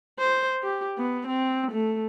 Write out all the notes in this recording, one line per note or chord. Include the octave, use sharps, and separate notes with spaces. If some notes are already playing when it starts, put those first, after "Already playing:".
C5
G4
B3
C4
A3